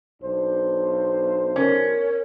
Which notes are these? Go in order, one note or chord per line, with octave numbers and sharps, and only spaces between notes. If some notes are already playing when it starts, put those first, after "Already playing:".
B1 D4 C5
C#4 A#4